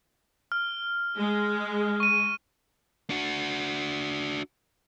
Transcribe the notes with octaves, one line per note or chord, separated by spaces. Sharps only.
F6
G#3
C#6 D#7
D4 F#4